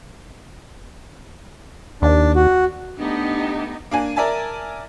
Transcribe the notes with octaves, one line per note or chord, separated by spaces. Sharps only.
D#2 D4
F#4
A3 B3 D4 D#4 G4
A#3 D4 G#5
A#4 D5 E5 G#5 A5